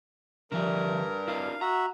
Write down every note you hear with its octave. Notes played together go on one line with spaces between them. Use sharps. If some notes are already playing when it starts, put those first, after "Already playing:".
G2 D3 F3 A#4 E5
D4 E4 F5
F#4 E5 A#5